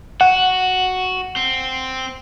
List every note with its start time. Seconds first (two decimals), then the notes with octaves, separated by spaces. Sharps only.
0.21 F#4 F#5
1.36 C4